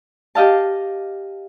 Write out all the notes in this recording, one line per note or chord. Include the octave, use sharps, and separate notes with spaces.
G4 D#5 F5 A5